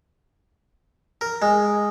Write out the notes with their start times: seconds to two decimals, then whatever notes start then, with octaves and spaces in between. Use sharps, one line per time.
1.21 A#4
1.42 G#3